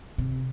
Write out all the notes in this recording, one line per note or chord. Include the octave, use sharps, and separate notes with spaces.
C3